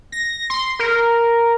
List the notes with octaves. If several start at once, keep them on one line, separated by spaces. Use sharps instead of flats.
A#6
C6
A#4